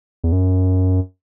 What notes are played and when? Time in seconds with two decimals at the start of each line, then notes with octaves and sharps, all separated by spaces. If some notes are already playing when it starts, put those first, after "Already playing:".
0.24 E2
0.32 F#2